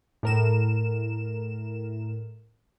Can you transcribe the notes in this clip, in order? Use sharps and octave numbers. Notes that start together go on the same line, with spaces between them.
A2 A#4 E7